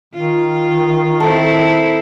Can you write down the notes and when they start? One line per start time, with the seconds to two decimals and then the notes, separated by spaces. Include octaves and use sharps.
0.14 D#3 F4
1.20 C4 E4 A4